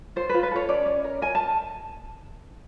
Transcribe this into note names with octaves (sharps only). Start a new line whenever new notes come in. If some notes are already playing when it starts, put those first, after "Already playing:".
F4 C5
B4
F4
B4
A4 C#5
C#4 D5
C#4
A#4
A#4 G#5
A5